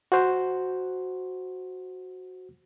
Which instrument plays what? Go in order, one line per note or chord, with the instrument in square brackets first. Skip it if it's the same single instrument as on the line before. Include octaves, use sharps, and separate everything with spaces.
[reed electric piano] F#4 C5